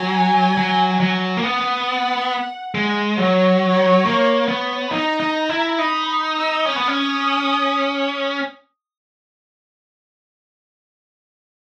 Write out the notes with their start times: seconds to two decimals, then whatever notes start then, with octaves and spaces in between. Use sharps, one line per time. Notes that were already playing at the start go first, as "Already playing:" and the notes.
Already playing: F#3 G#5
0.57 F#3
1.00 F#3
1.37 A#3
1.44 B3 F#5
2.75 G#3
3.18 F#3 C#5
4.05 A#3
4.48 B3
4.91 D#4 A#5
5.20 D#4
5.49 E4
5.78 D#4 B5
6.36 E6
6.65 C#4 D#6
6.76 B3
6.88 C#4